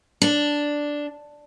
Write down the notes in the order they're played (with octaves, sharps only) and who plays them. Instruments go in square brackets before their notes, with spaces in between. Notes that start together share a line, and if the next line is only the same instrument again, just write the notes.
[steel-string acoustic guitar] D4